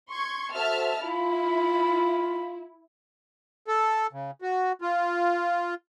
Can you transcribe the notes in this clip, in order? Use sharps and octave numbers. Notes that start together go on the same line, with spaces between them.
C6 C#6 G#6
F#4 A4 C5 E5 A5 F6
E4 F4 B5
A4
C#3
F#4
F4